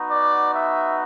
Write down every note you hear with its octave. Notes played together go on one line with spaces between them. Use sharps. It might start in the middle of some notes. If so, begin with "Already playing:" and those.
Already playing: B3 D#4 F#4
D5
E5